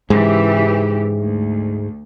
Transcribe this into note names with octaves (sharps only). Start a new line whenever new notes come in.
G#2 C#3 E3 G#3 G4
D2